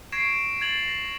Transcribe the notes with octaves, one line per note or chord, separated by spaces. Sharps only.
C#6 G#6 A#6 C7 D7 E7
G#6 A6 F7 F#7
A#6